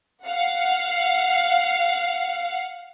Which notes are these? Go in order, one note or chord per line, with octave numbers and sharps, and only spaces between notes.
F5 F#5